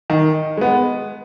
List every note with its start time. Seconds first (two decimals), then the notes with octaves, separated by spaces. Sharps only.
0.10 D#3
0.57 G#3 B3